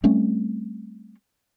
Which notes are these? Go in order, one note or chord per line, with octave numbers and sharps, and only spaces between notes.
G3 A3 C4 C#4